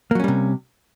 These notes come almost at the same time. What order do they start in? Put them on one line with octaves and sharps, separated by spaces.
A#3 F#3 C#4 G3 C3